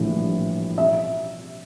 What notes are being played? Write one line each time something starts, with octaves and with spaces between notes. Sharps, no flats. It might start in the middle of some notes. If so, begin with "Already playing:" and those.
Already playing: A#1 A2 E3 G3
E5